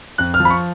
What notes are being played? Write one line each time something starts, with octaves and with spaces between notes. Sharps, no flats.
F2 F#6
F6
F3
B5
C#6